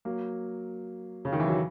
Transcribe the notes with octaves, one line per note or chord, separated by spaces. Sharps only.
F#3 A#3
C#3
D#3
E3
F#3